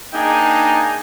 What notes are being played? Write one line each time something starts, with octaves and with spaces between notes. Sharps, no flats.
A#3 D4 D#4 G#4 G5